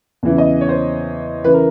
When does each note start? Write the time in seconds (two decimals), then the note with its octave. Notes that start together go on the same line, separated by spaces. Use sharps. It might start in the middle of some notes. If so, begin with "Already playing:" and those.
0.23 E2 C#3 E3
0.38 D#5
0.61 C#5
0.69 C5
1.44 C#3 E3 B4
1.54 A#4